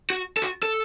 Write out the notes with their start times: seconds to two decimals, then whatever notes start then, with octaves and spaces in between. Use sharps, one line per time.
0.10 F#4
0.37 A4
0.42 F#4
0.63 A4